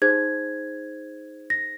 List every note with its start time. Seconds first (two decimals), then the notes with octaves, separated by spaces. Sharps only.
0.02 D#4 G#4 C5 G#6
1.50 A#6